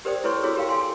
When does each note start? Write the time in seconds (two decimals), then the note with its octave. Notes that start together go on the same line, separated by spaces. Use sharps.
0.05 G4 A#4 C5 D5 G5 D#6
0.24 E4 A4 B4 C#5 C6 C#6
0.43 E4 F#4 G#4 C#5 E6
0.56 G4 A#4 F5 G5
0.69 A4 F5 G#5 C6